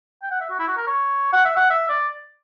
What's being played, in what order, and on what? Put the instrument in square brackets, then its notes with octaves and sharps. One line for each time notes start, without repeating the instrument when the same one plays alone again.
[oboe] G5
F#5
E5
F#4
E4
F#4
A#4
C#5
F#5
E5
F#5
E5
D5